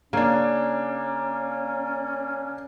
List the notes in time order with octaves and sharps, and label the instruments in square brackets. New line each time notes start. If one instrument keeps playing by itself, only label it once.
[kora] C#3 [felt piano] A#3 D4 [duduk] C#4